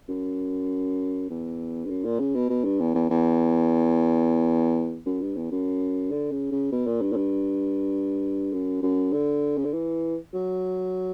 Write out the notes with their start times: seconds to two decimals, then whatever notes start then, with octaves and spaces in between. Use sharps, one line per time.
0.09 F#2
1.30 E2
1.85 G2
1.90 F#2
2.05 A#2
2.20 C#3
2.35 B2
2.50 B2
2.65 G2
2.80 E2
2.95 E2
3.10 E2
5.06 F#2
5.22 G2
5.36 E2
5.52 F#2
6.11 D3
6.31 C#3
6.52 C#3
6.72 B2
6.87 A#2
7.02 G2
7.13 A#2
7.17 G2
8.53 F#2
8.83 F#2
9.13 D3
9.58 C#3
9.65 D3
9.73 E3
10.34 F#3